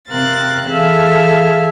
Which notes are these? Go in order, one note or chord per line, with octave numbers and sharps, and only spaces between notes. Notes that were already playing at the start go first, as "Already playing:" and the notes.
C3 C4 A#4 F5 F#6 A6
E3 G#4 A4 E5 F5 F6